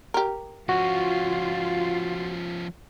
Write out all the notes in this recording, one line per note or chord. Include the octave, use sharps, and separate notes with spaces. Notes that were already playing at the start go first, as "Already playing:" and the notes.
G4 A#4
F3 C#4 F4 F#4